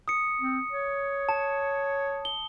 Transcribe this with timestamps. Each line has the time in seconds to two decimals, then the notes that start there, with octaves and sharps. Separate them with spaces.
0.08 D#6 C#7
0.41 C4
0.72 C#5
1.29 A5
2.25 G7